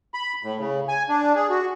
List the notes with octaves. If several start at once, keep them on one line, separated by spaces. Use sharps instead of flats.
B5
A2
C#3
G#5
D4
G#4
F#4